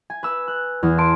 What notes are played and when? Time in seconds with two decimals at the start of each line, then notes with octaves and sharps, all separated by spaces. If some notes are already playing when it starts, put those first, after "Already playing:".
0.10 G#5
0.23 B4 E6
0.48 F#6
0.83 E2
0.98 A5 C6 D7